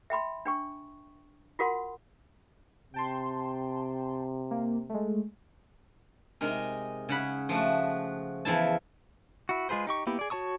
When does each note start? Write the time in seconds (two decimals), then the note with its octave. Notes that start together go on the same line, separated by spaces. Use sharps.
0.10 E5 G5 B5 C6
0.45 D4 G5 C#6
1.59 F4 F#4 A#4 F#5 C6
2.94 C3 G5 A5 C6
4.51 A#3
4.89 G#3 A3
6.41 C3 G#3 D#4 A#4
7.09 C#3 F#5 B5
7.49 F3 A3 F#4
8.45 E2 F3 E4 A5
9.49 E4 F#4
9.69 G#3 F4 G#4 B4 C5
9.87 D#4 G4 C#6
10.07 A#3 B3 E4 G4
10.19 G#4 D5
10.30 F#4 C#5 A5 C#6 D#6